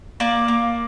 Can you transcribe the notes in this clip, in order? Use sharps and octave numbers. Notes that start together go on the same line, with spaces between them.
A#3 D5
A#3